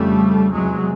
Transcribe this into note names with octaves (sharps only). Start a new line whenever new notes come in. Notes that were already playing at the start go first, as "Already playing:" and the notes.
Already playing: F2 C#3 G3 A3
E2 C3 F#3 G#3